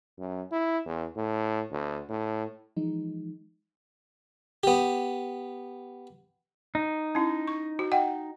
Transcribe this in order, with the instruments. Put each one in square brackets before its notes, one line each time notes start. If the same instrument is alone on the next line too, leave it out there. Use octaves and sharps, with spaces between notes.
[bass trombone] F#2
E4
E2
A2
D2
A2
[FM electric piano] E3 F3 G#3 D#4
[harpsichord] B3 G4
[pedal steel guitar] D#4
[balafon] C#4 E4
C#6
F#4
D#5 F#5 G5